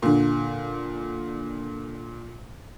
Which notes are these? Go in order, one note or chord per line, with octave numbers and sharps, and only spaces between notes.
A#2 D3